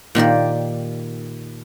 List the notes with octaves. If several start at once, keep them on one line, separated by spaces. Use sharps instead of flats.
A#2 D#3 G4 D5